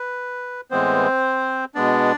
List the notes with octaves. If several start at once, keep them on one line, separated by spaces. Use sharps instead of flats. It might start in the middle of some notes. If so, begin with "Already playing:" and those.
Already playing: B4
A2 E3 G#3 B3 C4 C5
B2 G#3 B3 D4 D5